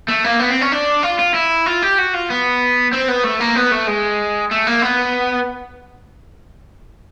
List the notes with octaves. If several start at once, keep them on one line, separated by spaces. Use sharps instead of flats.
A3
A#3
B3
C4
C#4
D4
F4
F4
E4
F4
G4
F#4
F4
B3
C4
B3
A3
A#3
B3
A3
G#3
A3
A#3
B3